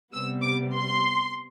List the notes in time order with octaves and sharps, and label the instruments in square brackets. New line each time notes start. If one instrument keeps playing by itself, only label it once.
[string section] C3 G3 B3 E6
D6
C6